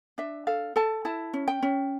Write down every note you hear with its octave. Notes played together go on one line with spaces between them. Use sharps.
D4 E5
A4 F5
A4 A5
E4 A5
C#4
G5
C#4